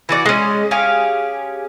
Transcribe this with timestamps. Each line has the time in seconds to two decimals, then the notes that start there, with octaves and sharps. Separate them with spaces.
0.09 E3 F#4 D5
0.26 G#3 C#4
0.71 C#4 G4 G#4 F5